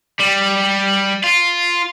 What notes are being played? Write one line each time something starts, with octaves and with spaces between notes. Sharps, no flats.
G3
F4